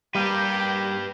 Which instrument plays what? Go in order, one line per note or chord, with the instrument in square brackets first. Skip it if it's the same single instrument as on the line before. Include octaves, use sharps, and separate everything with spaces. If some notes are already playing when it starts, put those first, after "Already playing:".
[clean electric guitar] G3 A#3 [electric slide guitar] G4 B4 [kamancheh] G5